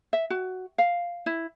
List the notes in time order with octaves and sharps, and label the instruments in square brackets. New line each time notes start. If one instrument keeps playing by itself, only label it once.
[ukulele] E5
F#4
F5
E4